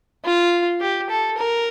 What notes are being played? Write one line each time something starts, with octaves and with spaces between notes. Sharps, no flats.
F4
G4
A4
A#4